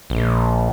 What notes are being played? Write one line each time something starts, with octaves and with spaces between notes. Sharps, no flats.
A#1